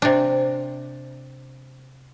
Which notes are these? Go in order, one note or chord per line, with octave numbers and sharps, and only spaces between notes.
C3 D4